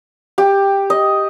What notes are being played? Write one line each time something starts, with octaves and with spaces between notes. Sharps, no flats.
G4
D#5